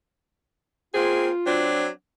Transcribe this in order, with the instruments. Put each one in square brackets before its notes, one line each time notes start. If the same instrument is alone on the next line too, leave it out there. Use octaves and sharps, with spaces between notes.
[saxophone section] A#3 C4 G#4 [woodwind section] F4
[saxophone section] F#3 C4 D4